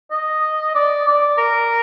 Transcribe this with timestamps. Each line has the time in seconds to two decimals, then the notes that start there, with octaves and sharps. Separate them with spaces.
0.12 D#5
0.75 D5
1.07 D5
1.38 A#4